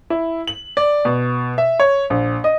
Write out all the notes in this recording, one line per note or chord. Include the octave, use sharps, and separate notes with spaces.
E4
F#7
D5
B2
E5
C#5
A#1
D#5